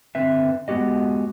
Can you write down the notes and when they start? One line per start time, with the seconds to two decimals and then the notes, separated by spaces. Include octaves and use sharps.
0.15 D3 C4 B4 E5
0.68 G#3 B3 F#4 G4 D#5